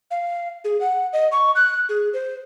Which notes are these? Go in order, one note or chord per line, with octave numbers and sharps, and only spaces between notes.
F5
G#4
F#5
D#5
C#6
F#6
G#4
C5